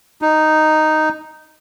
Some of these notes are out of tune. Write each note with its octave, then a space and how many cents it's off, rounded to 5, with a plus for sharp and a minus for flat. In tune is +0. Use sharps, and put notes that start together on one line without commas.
D#4 -5